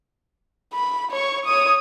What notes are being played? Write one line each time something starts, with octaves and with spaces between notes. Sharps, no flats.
B5
C#5 C#6
C#5 D#6